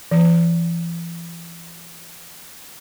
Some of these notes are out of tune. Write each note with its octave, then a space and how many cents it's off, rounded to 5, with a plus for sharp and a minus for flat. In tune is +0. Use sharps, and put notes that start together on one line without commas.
E3 +40